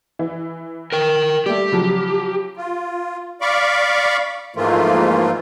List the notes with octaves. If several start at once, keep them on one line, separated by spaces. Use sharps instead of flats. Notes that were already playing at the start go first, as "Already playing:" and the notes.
E3
A#4 G5
G3 A3 G4
C#3 F3 F#3
F4
D5 F5 B5 C#6 D6
G#2 E3 F3 A3 A#3 F4